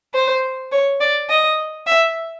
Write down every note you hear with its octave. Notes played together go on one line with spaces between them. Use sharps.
C5
C#5
D5
D#5
E5